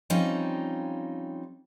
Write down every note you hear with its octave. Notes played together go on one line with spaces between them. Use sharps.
F3 G3 C4 C#4 D#4